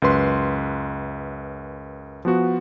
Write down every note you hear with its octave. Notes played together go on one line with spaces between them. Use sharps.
C#2 F#2 B4 C6
F3 B3 F#4